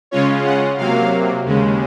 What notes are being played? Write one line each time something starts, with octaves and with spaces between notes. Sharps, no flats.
C#3 G#3 C#4 F4 C#5
F#5
C3 F#3 A#3 F5
D#2 C#3 G#3